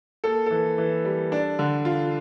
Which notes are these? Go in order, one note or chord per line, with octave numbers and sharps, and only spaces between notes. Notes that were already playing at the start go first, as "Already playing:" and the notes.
A#3 A4
E3 A4
E3
G3
D4
D3
F4